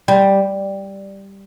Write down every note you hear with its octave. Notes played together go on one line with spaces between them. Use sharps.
G3